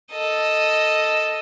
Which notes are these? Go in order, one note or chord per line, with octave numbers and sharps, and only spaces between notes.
A4 D#5